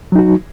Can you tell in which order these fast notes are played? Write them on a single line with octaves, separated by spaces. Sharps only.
F#3 D#4 F#4